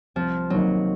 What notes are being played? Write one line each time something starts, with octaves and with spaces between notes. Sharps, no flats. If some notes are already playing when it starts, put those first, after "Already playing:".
C2 F3
C3 D#3 F#3 A#3 D#4